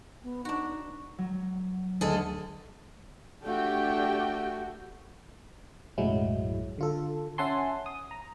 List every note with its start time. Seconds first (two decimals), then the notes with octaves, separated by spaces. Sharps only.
0.24 B3
0.45 D4 D#4 F#4
1.18 F#3
2.01 D2 G#4 A4 D#5
3.43 A3 D4 F#4 G4 G5
5.98 B1 F#2 A2 F#3 G#3 E4
6.78 D3 F4 A4
7.38 C#4 E5 F#5 G#5 A5 C6
7.86 D#6
8.11 A#5